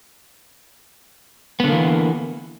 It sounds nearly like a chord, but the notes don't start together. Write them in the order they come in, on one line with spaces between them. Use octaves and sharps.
B3 D3 A#3 E3